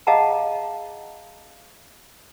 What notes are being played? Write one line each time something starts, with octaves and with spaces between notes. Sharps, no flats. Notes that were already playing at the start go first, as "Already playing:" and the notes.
G#4 D#5 F5 F#5 A5 A#5